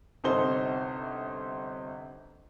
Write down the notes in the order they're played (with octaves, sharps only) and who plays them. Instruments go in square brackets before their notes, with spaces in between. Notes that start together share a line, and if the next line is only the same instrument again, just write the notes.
[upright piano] G1 C3 D#4 A4 C5 G7